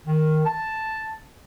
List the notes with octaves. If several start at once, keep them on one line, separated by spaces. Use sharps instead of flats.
D#3
A5